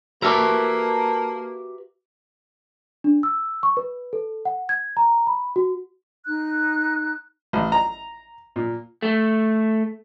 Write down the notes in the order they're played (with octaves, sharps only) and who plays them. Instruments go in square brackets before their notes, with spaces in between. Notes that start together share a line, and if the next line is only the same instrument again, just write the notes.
[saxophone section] A#3 [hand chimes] F#4 G4 D6 [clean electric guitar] A4 [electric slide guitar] B4 E5 A#5
[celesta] D4
E6
C#6
B4
A4
F#5
G#6
A#5
B5
F#4
[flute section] D#4 F#6
[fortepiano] A1
A#5
A#2
[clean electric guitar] A3